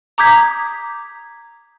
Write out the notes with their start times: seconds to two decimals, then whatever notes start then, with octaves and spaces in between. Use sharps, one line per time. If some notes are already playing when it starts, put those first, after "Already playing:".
0.18 A#5 D6 D#6 G6 G#6 B6